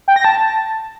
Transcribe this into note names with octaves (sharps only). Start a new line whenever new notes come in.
G5
A#6
A5